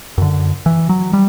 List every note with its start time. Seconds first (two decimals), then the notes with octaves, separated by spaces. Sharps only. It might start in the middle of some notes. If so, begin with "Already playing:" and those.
0.18 F#2 D3
0.66 E3
0.89 F#3
1.13 G3